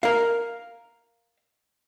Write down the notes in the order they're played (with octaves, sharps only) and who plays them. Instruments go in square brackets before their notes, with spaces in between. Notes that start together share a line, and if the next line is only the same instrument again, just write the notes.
[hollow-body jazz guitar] A#4 F5